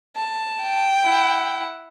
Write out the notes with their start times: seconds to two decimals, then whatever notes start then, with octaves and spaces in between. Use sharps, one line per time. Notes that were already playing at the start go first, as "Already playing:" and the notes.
0.16 A5
0.63 G5
1.04 E4 F#5